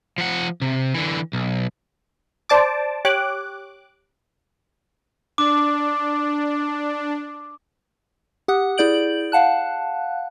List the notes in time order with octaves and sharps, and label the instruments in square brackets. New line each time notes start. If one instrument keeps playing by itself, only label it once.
[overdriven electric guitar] F3 F#5
C3
D3 E3
B1
[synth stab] C5 D5 A5 D6
G4 C#5 D6 F#6
[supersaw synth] D4 [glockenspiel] D6
[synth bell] G4 F#5 D#6 F#6
E4 G#4 D5 G6 D7 F#7
F5 F#5 A5 F#6